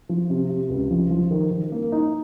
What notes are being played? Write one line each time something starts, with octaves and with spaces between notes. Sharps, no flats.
F3
C3
C3
C#2
F3
F3
D#3
D#3
A#3
D#4